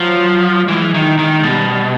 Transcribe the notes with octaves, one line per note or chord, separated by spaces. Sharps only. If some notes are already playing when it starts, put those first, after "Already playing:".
Already playing: F3 F#3
E3 G#3
D#3
D#3
B2 G3